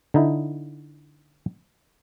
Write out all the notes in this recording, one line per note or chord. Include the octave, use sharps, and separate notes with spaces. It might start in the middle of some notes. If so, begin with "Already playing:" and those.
D3 D#4 E4